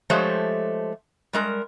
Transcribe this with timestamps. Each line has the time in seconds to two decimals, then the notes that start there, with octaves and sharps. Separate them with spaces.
0.10 F3 G#3 A3 G4 C5 C#5
1.33 G3 G#3 A#4